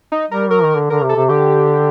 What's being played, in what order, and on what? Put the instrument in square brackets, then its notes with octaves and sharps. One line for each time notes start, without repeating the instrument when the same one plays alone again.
[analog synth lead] D#4
[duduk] G3 [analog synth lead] A#4
[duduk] F#3 [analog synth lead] A#4
[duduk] D#3
D3
[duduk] D3 [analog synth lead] A#4
[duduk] C3
[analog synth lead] A4
[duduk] C3
[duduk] D3 [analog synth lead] G4